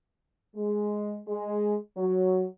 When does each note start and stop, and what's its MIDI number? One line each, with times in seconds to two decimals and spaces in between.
0.55 1.18 56
1.27 1.75 56
1.96 2.45 54